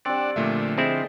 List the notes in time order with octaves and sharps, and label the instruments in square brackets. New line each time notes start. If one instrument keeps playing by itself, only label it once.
[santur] G3 C4 [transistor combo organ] D4 D5 F#5
[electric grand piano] A#2 A3 E5 [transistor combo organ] D3 F3
[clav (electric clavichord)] C4 E4 [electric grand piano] G#4 D#5